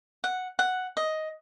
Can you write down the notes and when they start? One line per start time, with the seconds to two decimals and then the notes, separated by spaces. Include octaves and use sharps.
0.24 F#5
0.59 F#5
0.97 D#5